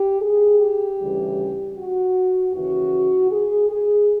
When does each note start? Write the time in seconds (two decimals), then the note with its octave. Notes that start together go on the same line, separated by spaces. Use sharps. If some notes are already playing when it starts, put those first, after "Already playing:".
Already playing: G4
0.22 G#4
0.60 G4
0.99 D2 C#3 E3 G3
1.76 F#4
2.54 D#2 C#3 E3 F#4
3.31 G#4
3.70 G#4